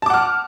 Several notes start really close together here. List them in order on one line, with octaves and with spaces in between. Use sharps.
A5 D6 F#5 F6